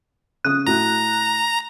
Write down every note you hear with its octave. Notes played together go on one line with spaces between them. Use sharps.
C#3 D#6 F#6
A2 F#4 A#5